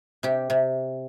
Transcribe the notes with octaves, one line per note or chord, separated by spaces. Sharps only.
C3 G4
C3